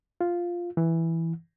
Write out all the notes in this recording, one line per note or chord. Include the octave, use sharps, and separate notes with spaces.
F4
E3